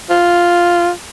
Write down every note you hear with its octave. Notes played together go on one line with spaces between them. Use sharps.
F4